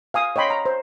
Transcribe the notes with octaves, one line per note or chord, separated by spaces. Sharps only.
F5 G#5 D#6
C#5 D#5 G5 B5 C6
A#5
C5